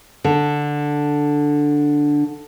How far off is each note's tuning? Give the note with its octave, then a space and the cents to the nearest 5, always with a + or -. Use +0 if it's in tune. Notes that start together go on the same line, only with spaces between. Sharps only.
D3 +0